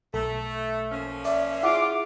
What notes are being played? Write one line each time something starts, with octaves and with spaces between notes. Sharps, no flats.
B1 A3 A4
F3 A#3 C#4
D5 E5
E4 F4 G#4 F#5 D6